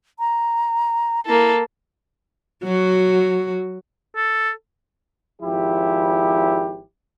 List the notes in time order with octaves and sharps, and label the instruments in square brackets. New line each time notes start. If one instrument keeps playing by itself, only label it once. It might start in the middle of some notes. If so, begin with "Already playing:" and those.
[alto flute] A#5
[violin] A#3 A4 [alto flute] E4
[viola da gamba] F#3 F#4
[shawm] A4
[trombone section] G#1 F3 E4 G4